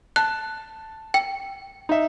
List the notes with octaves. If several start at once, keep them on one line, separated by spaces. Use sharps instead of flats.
A5 F#6
G5
D#4 E5